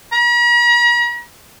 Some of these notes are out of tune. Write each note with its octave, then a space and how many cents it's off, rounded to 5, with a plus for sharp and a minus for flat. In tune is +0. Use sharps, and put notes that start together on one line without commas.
A#5 +45